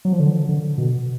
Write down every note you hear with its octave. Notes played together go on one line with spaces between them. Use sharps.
F#3
F3
D3
D3
B2